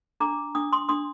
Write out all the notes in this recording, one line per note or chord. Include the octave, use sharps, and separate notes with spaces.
D4 A#5 D6
D4 D#6
C6 D#6
D4 C6 D#6